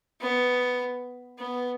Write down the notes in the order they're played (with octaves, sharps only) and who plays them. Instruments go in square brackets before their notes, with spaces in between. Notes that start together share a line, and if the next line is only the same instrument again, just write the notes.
[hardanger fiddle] B3
B3